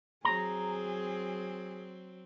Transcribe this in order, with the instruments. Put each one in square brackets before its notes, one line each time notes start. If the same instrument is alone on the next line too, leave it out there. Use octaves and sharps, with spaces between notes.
[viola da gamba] F#3 C4 [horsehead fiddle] G#4 [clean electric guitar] A#5